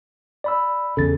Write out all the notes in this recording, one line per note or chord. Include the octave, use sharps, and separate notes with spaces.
D5 B5 E6
E2 C#3 A4 A6